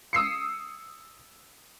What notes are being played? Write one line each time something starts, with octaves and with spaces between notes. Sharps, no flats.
D#6 E6 C7 C#7